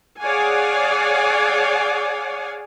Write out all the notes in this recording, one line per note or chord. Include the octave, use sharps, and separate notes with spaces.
G#4 C#5 D5 F5 F#5 G#5